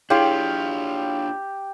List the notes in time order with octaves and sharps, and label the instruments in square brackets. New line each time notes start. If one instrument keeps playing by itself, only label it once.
[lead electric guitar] D4 F4 [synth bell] E4 G#4 [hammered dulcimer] G4 [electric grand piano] C#5 F5 C6